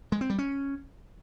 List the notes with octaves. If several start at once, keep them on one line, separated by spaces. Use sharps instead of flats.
G#3
C4
G3
C#4